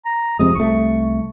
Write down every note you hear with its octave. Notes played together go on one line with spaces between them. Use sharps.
A#5
F2 C3 G#3 D#6
C2 A3 C#6